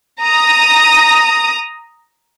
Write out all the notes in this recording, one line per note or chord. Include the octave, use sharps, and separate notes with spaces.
A#5 D#6